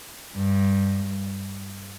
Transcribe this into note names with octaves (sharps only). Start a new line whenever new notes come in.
G2